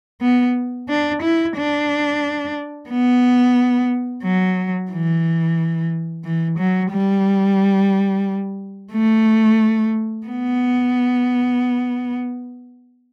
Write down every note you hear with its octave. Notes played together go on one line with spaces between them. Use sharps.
B3
D4
E4
D4
B3
F#3
E3
E3
F#3
G3
A3
B3